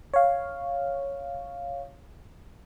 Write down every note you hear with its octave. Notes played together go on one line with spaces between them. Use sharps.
C#5 F5